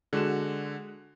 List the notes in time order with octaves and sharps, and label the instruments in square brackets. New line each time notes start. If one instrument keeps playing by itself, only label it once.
[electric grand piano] D3 E7 [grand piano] G#3 F#4